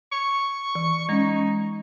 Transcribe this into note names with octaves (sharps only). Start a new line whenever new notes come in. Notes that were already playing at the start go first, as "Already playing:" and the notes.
C#6
E3
G#3 C#4 D#4